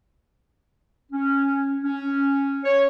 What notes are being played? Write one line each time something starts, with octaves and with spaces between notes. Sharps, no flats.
C#4
C#4
C#5